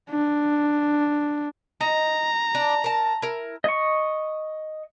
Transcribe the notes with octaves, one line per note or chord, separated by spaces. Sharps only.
D4
D#4 A#5
D4
A#4 A5
E4 A#4
D#5 C#6